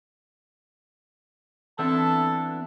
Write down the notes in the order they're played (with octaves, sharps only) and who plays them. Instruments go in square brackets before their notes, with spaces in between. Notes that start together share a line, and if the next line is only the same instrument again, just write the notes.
[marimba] E3 C4 [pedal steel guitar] B3 D4 E4 [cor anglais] A4 [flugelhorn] A5